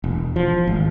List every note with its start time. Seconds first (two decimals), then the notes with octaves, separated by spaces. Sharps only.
0.04 E1
0.36 F3
0.67 G#1